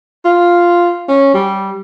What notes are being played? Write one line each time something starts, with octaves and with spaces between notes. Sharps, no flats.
F4
C#4
G3